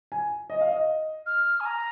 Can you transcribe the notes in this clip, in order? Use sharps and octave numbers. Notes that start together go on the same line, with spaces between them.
G#5
D#5
F5
D#5
F6
G#5
A#5